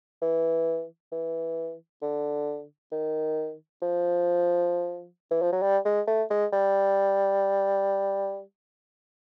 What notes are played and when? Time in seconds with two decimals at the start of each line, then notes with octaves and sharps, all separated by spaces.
0.22 E3
1.12 E3
2.02 D3
2.92 D#3
3.82 F3
5.31 E3
5.42 F3
5.52 F#3
5.62 G3
5.85 G#3
6.07 A3
6.30 G#3
6.53 G3